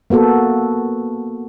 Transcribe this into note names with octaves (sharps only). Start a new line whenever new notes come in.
A#3 B3 F#4 A4